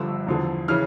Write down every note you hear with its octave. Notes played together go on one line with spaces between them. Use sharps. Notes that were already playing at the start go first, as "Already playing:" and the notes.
Already playing: G1 G2 D3 F3 E6
E2 D3 F3
C#3 E3 F6